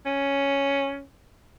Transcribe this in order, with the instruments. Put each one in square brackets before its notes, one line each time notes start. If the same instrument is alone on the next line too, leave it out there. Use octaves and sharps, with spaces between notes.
[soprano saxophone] C#4